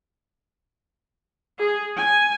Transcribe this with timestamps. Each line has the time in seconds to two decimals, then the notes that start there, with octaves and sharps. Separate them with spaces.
1.59 G#4
1.97 G#5